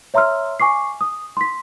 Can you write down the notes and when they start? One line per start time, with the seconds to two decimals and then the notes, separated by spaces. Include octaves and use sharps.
0.14 C#5 E5 A#5 C6 E6 F6
0.60 G#5 C#6 D6 C7
1.01 D#6
1.37 C6 B6